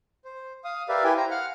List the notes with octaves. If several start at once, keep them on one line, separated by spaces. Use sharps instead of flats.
C5
F5 D#6
G4 A#4 B4 D5 E5 F5
E4 G4 B4 G5 G#5
C5 A#5
F5 F#5 F6